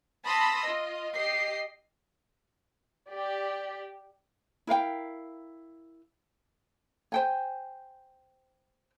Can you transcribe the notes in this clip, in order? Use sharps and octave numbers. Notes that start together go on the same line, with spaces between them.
A5 B5 C6 D#6 E6 A#6
F4 D#5
G4 D#5 C7
G4 D5
E4 A#4 F5 G5
C5 G5 G#5